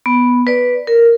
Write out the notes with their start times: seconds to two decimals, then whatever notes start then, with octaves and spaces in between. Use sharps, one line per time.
0.06 B3
0.47 B4 D5
0.87 A#4